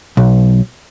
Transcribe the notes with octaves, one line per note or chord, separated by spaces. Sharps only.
B1